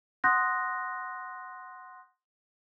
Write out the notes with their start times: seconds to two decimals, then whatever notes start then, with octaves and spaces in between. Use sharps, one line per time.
0.24 F#5 C6 D#6 F#6 G6 A#6